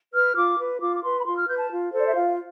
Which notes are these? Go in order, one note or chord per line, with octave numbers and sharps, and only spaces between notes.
B4 F6
F4 D6
B4
F4 D6
D6
B4 C6
B5
F4 C6
F6
B4 G6
A5
F4
A4 C5
D5
E5
F4 F5